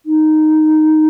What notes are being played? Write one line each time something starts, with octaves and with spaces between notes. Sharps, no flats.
D#4